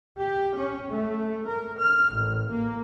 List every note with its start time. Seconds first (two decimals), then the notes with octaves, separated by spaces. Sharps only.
0.19 G4
0.55 C#4
0.90 A3
1.46 A#4
1.79 F6
2.14 A1
2.49 A#3